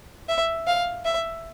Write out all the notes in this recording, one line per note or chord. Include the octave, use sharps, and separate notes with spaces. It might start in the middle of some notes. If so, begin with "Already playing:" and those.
E5
F5
E5